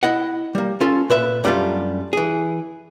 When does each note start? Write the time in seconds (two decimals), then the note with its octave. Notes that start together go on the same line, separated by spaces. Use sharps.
0.03 E4 D#5 F#5
0.55 G3 A#3
0.81 C#4 F4 A4
1.10 A#2 B4 E5 B5
1.44 F#2 G3 A3 C4 D4 F4
2.13 E3 G#4